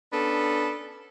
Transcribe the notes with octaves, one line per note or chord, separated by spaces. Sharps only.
B3 C#4 D4 A4